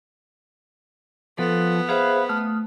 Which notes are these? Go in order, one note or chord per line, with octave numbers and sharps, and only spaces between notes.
F3 B3 A4
G#4 B4 C5 E5 F5
A3 D#6 F6